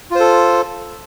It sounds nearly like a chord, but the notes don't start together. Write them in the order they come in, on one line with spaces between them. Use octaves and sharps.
F4 C5 A4